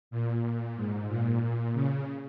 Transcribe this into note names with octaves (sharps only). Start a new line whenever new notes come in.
A#2
A#2
G#2
A#2
A#2
C#3